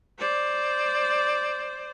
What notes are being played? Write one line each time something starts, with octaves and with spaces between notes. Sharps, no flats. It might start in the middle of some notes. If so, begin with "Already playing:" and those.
C5 D5